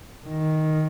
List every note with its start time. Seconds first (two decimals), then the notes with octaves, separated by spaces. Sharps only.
0.27 D#3